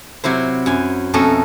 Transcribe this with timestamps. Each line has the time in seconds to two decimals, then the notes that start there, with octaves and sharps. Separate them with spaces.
0.24 C3 F#3 E4 C5
0.66 F#2 G#5
1.14 F2 B2 A3 C#4 A4 A#5